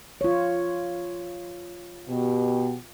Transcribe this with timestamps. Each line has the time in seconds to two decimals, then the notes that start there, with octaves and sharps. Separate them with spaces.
0.21 F4 C#5
2.08 B2 G4